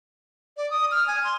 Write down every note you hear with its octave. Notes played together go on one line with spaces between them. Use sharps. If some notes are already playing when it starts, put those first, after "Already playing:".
D5
D#6
F6
G#5
C6